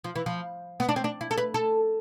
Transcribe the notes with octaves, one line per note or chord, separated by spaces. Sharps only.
F3
E3
F3
B3
D4
C4
D4
E4
A4
B4
A4